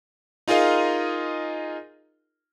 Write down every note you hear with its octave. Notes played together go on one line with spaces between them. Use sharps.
D#4 F4 G#4 A#4 D#5 F5